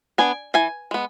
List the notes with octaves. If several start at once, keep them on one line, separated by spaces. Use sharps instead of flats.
B3 D4 G#5
E3 G#5
G#3 B3